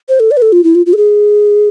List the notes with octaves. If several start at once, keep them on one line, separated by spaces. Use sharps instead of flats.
C5
A4
D5
B4
A4
F4
E4
F4
F4
A4
G#4